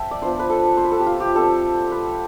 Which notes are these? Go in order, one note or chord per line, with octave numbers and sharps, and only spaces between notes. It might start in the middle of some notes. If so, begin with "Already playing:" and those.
Already playing: A3 C4 E5 G5 A5
D5
F3 B3 D4 C5
B4
A4
C5
B4
A4
G4
F4
G4
G3 C4 F4 A4
B4